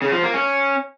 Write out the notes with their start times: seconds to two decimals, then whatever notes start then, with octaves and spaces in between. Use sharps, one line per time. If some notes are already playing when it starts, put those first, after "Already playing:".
0.02 C#3
0.12 F3
0.23 A#3
0.34 C#4